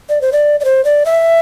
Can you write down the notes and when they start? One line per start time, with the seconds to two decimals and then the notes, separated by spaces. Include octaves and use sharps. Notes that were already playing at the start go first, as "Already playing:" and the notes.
0.09 D5
0.21 C5
0.33 D5
0.60 D5
0.65 C5
0.85 D5
1.06 E5